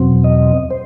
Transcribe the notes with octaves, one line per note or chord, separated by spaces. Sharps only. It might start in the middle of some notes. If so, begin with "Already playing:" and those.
Already playing: E2 B2 F#3 C4
D#5
C5